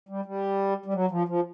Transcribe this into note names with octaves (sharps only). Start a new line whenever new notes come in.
G3
G3
G3
F#3
F3
F3